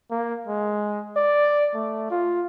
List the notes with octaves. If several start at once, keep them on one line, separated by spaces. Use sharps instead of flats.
A#3
G#3
D5
A3
F4